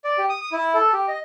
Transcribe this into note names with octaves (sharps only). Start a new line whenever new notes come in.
D5
G4
D#6
D#6
E4
A4
G4
D#5